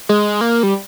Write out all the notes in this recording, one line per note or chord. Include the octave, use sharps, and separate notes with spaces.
G#3
A#3
G3